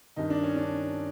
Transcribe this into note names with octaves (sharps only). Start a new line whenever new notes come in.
G2 D#3 D#4
D4
C#4
D4